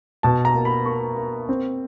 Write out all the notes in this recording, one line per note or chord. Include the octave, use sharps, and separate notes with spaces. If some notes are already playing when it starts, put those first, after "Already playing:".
B2 A5
A#5
A#3
B5
A#3 C#6
A#3
C4